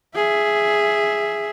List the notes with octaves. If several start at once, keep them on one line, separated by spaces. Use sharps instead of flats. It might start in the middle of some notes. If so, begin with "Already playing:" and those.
G#4 E5